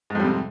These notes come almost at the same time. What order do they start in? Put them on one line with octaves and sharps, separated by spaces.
G#2 F2 G3 C3